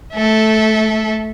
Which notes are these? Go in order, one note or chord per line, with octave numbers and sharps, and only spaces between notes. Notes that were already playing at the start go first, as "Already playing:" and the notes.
A3 A4 E5